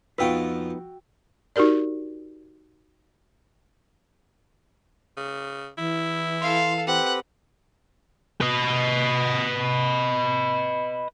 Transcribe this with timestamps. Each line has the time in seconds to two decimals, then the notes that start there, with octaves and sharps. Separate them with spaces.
0.18 F2 B3 D#4 F4 F#4 B4 G5 E6
1.56 D#4 F#4 G4 A#4 D5
5.17 C#3
5.78 E3 E4
6.41 A4 F5 C6
6.87 C4 G4 B4 F#5
8.41 B4 D#5